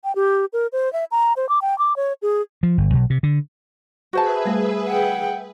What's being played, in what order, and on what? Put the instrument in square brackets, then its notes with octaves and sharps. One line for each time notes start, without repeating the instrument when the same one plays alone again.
[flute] G5
G4
A#4
C5
E5
A#5
C5
D6
G5
D6
C#5
G#4
[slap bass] F3
G1
B1
C3
D3
[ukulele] F#4 C5 A5 [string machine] G#4 B4 E5
[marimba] G3 A3
[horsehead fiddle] F#5 G5